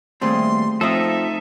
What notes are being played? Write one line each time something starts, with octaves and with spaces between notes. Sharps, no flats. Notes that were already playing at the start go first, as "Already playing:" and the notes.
D#2 F3 G3 A3 C4 G#4 C6
F3 C4 D#4 A4 E5 A5 D#6 F6